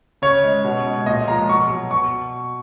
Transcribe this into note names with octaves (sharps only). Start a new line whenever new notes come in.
C#3 C#5
G#3
B2
G#3
A#2 D#5
F3 G#3 A#5
B2 C#6
F#3
B2 C#6